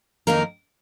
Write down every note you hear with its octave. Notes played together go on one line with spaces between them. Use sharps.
F2 D#3 A#3 D#4 A#4